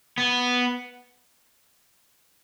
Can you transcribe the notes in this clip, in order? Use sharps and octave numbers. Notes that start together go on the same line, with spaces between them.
B3